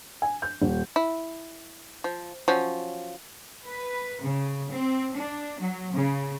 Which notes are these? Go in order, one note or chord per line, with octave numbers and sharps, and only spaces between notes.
G#5
G6
D#1
E4
F3
F3 F#3 C#4
B4
C#3
C4
D4
F#3
C#3